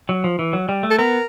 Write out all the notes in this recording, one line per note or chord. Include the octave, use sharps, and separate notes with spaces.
F#3
F3
E3
F#3
G3
A3
A4
B3 A#4